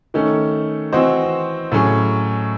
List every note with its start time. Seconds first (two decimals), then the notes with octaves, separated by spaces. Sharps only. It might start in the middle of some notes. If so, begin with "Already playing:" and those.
0.14 D#3 A3 C#4
0.93 E3 C4 F#4 C5 D#5
1.72 A2 F#3 C#4 G#4